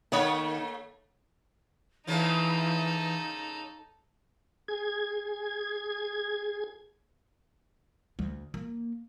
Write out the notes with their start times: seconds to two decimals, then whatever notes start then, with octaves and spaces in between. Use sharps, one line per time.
0.12 D#3 A3 A#3 C#5
2.07 C#3 E3 F3 A#3 D#4 A4
4.68 G#4 G#6
8.19 D2
8.54 A#3